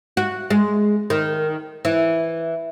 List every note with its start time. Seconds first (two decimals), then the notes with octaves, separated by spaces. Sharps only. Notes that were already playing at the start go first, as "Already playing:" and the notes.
0.17 F#4
0.50 G#3
1.10 D#3
1.85 E3